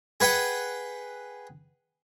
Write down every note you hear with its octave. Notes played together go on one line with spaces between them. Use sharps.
G#4 B4 F#5 G5